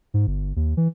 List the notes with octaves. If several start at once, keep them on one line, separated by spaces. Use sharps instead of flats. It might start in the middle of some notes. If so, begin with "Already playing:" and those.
G#2
G1
D#2
E3